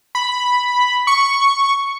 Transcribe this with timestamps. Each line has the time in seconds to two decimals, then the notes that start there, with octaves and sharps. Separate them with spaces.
0.15 B5
1.07 C#6